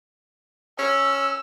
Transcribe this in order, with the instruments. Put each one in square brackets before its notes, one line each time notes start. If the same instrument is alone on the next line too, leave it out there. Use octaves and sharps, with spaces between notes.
[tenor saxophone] C#4 [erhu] E6